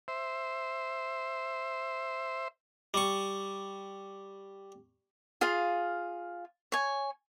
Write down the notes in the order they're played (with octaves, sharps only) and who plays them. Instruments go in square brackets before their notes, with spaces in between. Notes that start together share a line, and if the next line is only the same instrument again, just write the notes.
[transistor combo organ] C5 E5
[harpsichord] G3 C#6
[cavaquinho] F4 G#4 F5
C#5 G#5